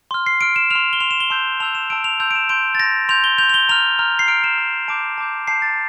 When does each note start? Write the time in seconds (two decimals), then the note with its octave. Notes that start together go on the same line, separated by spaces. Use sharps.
0.11 C6 F6
0.26 C7
0.41 C6 F6 D7
0.56 E7
0.71 C6 F6 F7
0.93 G7
1.00 C6 F6 F7
1.11 E7
1.20 G7
1.30 A5 C6 E6 G6
1.60 A5 C6 E6 G6 F7
1.75 E7
1.90 A5 C6 E6 G6 D7
2.04 F7
2.20 A5 C6 E6 G6 F7
2.31 D7
2.35 E7
2.49 C6 G6 D7
2.75 A6
2.79 C6 G6 A#6
3.09 C6 G6 F7
3.24 G7
3.38 G6 F7
3.43 C6
3.49 F7
3.54 G7
3.69 A#5 F6 F7
3.99 A#5 F6
4.19 C7
4.28 A#5 F6 D7
4.44 E7
4.58 A#5 F6
4.88 A5 D6 G6 D7
5.18 A5 D6 G6
5.47 A5 D6 G6 C7
5.62 A6